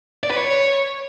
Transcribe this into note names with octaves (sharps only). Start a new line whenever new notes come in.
D5
B4
C#5